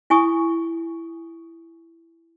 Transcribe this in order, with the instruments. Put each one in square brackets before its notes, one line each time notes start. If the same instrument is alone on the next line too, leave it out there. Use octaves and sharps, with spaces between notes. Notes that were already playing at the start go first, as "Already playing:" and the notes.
[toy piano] E4 G#5 C#6 D#6